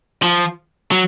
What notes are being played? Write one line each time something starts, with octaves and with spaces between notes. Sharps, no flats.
F3
F#3